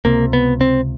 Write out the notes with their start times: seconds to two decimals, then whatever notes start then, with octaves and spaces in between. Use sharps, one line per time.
0.05 C#2 C3 A#3
0.33 B3
0.61 C4